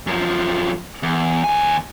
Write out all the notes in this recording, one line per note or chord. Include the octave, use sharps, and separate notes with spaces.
F#2 F3
E2
D#2 G#5